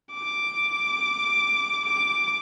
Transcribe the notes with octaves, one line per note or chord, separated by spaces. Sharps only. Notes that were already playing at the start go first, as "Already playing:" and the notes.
D6
D6